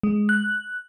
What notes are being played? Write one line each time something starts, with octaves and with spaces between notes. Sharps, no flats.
G#3
F#6